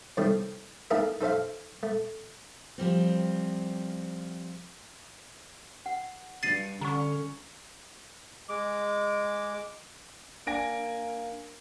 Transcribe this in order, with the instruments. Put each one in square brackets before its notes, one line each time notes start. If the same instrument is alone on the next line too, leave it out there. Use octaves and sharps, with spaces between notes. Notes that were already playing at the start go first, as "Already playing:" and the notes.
[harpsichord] A2 C3 D#3 G3 A3
A3 A#3 D#4 E4 G#4 A#4
D#4 A4 C5 E5 F5
A3
[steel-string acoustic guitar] F3 G3 C4
[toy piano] F#5
[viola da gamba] G2 [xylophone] A6 C7 D#7
[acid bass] D3 [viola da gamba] C#4 [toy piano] A#5 C#6
[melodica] G#3 D6
[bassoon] A#3 [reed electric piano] D4 [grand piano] G#5 A#6 D7